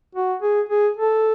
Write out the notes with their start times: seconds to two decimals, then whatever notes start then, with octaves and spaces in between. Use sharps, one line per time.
0.15 F#4
0.42 G#4
0.69 G#4
0.97 A4